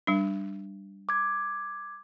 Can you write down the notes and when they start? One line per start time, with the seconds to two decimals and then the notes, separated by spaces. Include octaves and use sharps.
0.07 G3 D4
1.09 D6 G#6